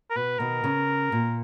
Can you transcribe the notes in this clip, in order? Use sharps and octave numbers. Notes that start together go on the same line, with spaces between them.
A#4
B2 B4
B2 D#3 A#4
C#3
A#2